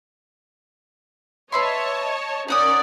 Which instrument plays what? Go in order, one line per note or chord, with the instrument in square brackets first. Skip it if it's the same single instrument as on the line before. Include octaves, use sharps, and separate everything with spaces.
[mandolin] B4 E5 C6 [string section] C#5 D#5 A5
[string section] C#4 A#4 D5 [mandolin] D#4 F#5 D#6